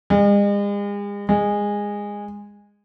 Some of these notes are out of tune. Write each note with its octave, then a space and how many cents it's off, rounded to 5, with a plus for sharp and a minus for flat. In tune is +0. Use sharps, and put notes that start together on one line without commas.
G#3 -40
G#3 -15